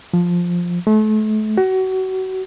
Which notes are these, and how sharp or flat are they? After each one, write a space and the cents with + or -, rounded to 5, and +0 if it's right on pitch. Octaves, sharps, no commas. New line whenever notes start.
F3 +5
A3 -35
F#4 +30